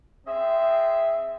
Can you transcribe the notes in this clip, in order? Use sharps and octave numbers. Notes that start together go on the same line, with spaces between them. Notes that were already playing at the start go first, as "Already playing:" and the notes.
C4 G#4 D#5 E5